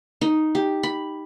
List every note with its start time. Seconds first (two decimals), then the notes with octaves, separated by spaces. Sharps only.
0.21 D#4
0.55 G4
0.83 B5